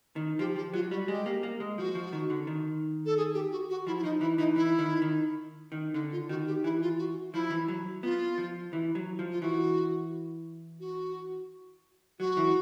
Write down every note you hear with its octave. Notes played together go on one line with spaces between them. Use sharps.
D#3
F3 G4
F3 G4
F#3 F4
G3 F#4
G#3 G4
A#3
A#3
G#3
F3 F#4
F3
D#3
D3
D#3
A4
G#4
G4
F#4
F#4
F3 E4
E4
F3 D#4
E3 E4
E3 D#4
E3 E4
D#3
D#3
D#3
D3 D#4
F4
D#3 F#4
G4
E3 E4
F4
F#4
F3 E4
E3
F#3
B3 F4
F3
E3
F#3
F3
F4
E3 F#4
F#4
F#3 F#4
E3